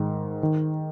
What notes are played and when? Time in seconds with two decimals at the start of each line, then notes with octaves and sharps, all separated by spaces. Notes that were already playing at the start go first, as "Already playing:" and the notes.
Already playing: G#2 D#3
0.43 D#3